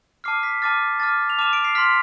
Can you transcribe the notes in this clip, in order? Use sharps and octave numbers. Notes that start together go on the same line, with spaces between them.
A5 D6 F6 C7
B6
A5 D6 F6 A6
A5 D6 F6 A6
F7
A5 D6 F6 E7
D7
C7
C6 F6 B6